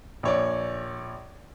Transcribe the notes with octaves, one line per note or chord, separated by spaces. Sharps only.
A#1 C#5 D5